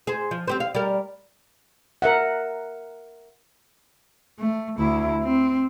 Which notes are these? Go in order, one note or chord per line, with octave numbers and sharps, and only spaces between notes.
G#4 C5
F3
C4 G4 C5
F5
G3 A#4
A#4 E5 F#5
A3
D2 E4
C4